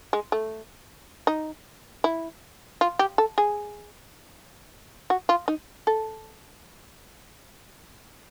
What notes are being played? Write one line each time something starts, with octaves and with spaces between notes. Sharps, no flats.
G#3
A3
D#4
E4
F4
G4
A4
G#4
F#4
F4
D#4
A4